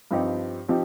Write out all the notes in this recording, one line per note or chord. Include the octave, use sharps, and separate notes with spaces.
G2 F3 C4 D#4 G4
F3 C4 D#4 G4